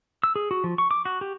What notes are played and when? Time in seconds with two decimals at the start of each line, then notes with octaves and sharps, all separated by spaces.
0.24 E6
0.36 G#4
0.51 F#4
0.64 F3
0.78 C#6
0.91 D6
1.05 F#4
1.21 G4